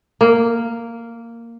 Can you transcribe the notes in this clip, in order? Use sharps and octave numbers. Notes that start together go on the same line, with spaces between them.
A#3